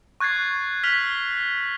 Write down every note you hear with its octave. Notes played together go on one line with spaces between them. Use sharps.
C#6 F#6 G#6 A6 C7
F6 B6 F7 F#7